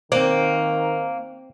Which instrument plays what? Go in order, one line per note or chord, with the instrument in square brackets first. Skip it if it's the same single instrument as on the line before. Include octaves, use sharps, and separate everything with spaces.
[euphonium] D#3 [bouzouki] A#3 [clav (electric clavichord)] C4 D5 [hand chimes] C5